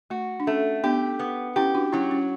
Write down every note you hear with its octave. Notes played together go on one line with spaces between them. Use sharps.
A3 F#4
D4
A3 C#4
B3 D4 G4
B3
C#4 E4 G4
D4 F#4
F#3 C#4 E4
C#4